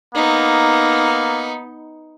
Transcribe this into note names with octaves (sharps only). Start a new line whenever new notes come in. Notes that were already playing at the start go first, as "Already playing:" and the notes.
A#3 B3 D#4